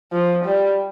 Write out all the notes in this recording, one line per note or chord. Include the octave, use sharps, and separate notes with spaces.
F3
G3